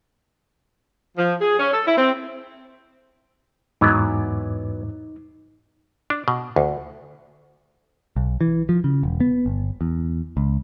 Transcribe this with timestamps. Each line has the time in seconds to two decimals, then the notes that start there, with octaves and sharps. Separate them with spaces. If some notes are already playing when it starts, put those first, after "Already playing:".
1.17 F3
1.41 G#4
1.59 C#4
1.73 A4
1.86 E4
1.97 C4
3.81 E2 G#2 E3 F#3 B3 D#4 D6
6.10 D4
6.28 B2
6.56 D2
8.16 B1
8.41 E3
8.69 F3
8.84 C#3
9.03 E1
9.20 B3
9.46 G1
9.81 E2
10.37 C#2